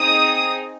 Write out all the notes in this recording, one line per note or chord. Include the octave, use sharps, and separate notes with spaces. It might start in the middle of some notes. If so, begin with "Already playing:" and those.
Already playing: C4 D#4 G#4 D#6